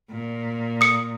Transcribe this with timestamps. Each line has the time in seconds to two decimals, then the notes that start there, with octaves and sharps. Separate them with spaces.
0.11 A#2
0.81 D#6 C#7